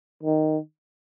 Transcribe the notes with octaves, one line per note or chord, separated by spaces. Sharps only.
D#3